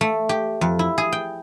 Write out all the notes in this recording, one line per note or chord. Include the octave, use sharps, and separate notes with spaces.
A3
G4
F2
E4
G#4
G5